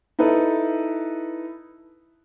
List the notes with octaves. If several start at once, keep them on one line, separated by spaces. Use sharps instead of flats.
D#4 E4 A4 B4